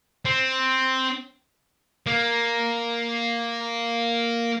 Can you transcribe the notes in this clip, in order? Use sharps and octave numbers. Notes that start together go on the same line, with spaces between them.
C4
A#3